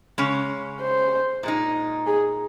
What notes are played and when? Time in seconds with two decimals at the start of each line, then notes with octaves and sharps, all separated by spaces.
0.18 C#3 G#3 C#4
0.81 C5
1.43 A#2 G#3 D#4
2.07 G#4